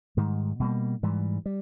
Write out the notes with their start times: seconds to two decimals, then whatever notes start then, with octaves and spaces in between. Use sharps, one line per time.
0.17 G#2 D#3 G3
0.60 B2 G3 A#3
1.03 G#2 E3 G3
1.46 G3